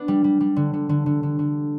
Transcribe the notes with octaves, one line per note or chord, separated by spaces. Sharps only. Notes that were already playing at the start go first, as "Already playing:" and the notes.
Already playing: B3 D4
G3
G3
G3
D3
D3
D3
D3
D3
D3